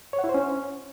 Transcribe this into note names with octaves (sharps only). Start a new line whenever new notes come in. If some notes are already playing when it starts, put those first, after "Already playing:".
C#5
F#5
E4
C5
C#4